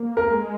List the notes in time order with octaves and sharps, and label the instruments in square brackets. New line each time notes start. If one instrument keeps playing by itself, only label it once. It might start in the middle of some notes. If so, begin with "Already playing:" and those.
Already playing: [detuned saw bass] A#3
[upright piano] A#4
[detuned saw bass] G#3